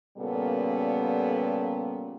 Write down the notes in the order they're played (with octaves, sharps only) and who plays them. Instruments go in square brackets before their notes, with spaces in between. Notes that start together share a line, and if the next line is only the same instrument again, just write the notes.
[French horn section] A#2 C#3 G3 B3 A4